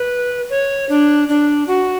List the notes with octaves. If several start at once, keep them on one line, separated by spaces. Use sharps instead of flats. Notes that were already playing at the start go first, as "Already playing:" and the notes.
Already playing: B4
C#5
D4
D4
F#4